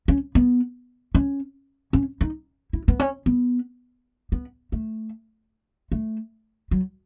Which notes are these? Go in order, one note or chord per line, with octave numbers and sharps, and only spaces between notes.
C#4
B3
C#4
C#4
D#4
E4
B3
C#4
B3
B3
A3
A3
F#3